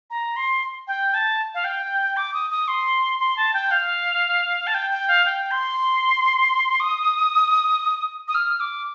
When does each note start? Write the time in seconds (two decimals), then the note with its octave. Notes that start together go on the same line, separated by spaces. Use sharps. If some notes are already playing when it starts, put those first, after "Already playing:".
0.10 A#5
0.36 C6
0.87 G5
1.14 A5
1.54 F5
1.64 G5
2.17 D6
2.34 D#6
2.50 D#6
2.68 C6
3.20 C6
3.37 A5
3.54 G5
3.71 F5
4.67 A5
4.74 G5
4.91 G5
5.08 F5
5.25 G5
5.51 C6
6.80 D#6
8.28 D#6
8.35 F6
8.60 D6